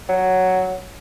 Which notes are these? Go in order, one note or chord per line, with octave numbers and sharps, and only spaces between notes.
F#3